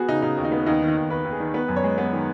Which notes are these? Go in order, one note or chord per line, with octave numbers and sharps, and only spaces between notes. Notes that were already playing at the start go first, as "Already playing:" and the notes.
Already playing: B3 F#4 G#4
C#3 D#4
C#3 D#4
D#2
D#4
B3
D#2 D#4
D#3
D#4
D#2
D#2 B4
D#2
G#4
D#3
B3 B4
F#2
C#5
G#3
B3
D#3